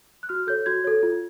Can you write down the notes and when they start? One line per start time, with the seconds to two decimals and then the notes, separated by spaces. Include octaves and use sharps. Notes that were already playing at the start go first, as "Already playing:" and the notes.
0.23 F#6
0.29 F#4 F6
0.47 A4 C#5 G6
0.66 F#4 G#6
0.84 A4 C#5
1.03 F4